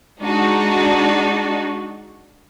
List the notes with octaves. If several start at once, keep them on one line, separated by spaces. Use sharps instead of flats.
G#3 D4 D#4 F#4